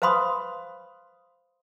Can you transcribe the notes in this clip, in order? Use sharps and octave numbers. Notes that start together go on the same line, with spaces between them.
B4 C5 F5 B5 C6 D#6